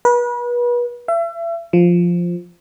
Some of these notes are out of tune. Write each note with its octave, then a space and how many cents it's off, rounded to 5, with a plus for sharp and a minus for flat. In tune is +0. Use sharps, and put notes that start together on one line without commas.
B4 -35
E5 +35
F3 +0